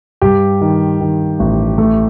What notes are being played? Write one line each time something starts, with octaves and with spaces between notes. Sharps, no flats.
G2 G4
D#3
D#3
A1
A3